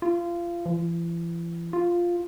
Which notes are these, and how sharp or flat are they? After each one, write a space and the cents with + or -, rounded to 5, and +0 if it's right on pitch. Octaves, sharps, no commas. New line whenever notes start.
F4 -25
E3 +40
F4 +0